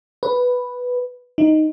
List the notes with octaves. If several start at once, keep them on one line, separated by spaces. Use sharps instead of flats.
B4
D#4